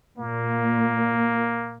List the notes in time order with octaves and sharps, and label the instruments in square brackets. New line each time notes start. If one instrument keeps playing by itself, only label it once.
[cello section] A#2 [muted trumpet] A#3